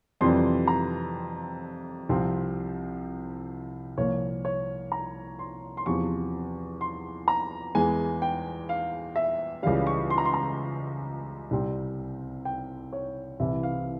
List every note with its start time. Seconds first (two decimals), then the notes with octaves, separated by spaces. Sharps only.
0.21 F2 C3 E3 G3 C4 C6
0.67 A#5
2.09 C2 C3 F3 C4
3.98 C2 A#2 F3 A#3 C#5
4.45 C#5
4.92 A#5
5.39 C6
5.77 C6
5.86 E2 C3 F3 C#6
6.81 C6
7.28 A#5
7.75 E2 E3 G#3 G#5
8.22 G5
8.69 F5
9.16 E5
9.63 C#2 C#3 E3 G3 F5
9.87 C#6
10.10 C6
10.18 A#5
10.25 C6
10.34 A#5
11.51 C2 C3 G3 C4
12.45 G5
12.93 C#5
13.40 C2 C3 E3 E5
13.63 F5